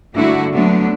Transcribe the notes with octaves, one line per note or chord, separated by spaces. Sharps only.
G2 D3 A3 A#3 E4 F#4
D3 F#3 A3 B3 D4